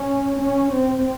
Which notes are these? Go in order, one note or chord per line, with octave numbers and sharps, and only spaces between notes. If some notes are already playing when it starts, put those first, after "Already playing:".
Already playing: C#4
C#4
C4